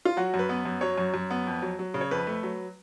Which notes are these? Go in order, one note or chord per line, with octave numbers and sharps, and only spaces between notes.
F4
F#3 F#4
F#2
B4
B3
F#2
F#3 C#5
F#2
F#2
B3
F2
F#3
F#3
C#3
C#5
F2 B4
A3
F#3